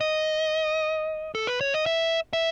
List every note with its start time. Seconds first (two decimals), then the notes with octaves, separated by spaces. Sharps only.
0.01 D#5
1.35 A4
1.47 B4
1.61 C#5
1.74 D#5
1.86 E5
2.33 E5